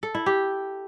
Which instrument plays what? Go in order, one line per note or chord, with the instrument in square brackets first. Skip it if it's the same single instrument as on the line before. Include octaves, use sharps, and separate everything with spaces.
[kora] A4
E4
G4